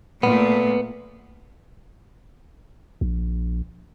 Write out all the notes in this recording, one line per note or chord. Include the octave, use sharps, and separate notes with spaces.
A#2 A3 B3
A#1